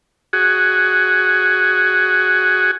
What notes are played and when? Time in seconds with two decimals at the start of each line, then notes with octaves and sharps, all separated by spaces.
0.33 F#4 G#4